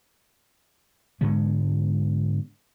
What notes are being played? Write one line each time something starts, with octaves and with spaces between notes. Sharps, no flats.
G#2 D3 G#3 B3